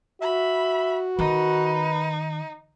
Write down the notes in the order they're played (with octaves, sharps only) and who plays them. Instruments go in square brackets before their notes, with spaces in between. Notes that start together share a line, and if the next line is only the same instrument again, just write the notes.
[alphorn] F#4 [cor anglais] E5 [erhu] B5
[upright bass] D#3 [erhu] D#4 [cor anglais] B4